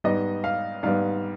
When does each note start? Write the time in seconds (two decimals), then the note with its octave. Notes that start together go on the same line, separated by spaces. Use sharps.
0.04 G#2 G3 B3 D#5
0.44 F5
0.83 G#2 G3 B3 F5